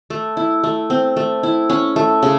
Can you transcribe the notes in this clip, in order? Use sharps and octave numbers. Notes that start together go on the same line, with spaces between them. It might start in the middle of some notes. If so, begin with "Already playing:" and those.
A3
E4
A3
C4
A3
E4
C#4
A3
C#3